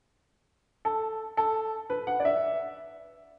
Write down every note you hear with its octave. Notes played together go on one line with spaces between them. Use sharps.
A4
A4
B4
F#5
D5
E5